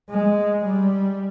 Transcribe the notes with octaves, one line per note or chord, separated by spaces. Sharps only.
G#3
G3